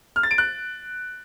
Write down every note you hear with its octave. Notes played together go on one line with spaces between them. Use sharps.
F6
A6
D7
F#6